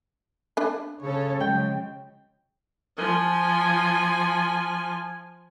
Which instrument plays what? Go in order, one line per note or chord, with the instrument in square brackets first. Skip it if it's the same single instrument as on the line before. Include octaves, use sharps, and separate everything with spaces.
[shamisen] D4 B5
[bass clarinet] C#3 [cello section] C#4 A4 C#5
[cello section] C#3 F3 F#3 [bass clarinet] G#3 [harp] G5
[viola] F3 G#5